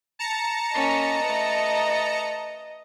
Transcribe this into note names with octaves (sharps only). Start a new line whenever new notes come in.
A5 A#5 C#7
A#3 C#4 D#5
A3 B4